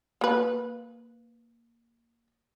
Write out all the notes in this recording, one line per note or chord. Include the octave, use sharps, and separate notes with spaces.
A#3 B4